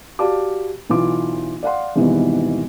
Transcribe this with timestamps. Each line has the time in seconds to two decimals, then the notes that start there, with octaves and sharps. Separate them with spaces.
0.19 F#4 G4 D5 F5 A5 D6
0.89 B1 E3 E4 F4 D6
1.63 D5 F5 F#5 C6
1.96 G#1 E2 G#2 B2 E3 G3